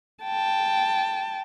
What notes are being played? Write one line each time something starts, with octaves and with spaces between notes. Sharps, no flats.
G5 A5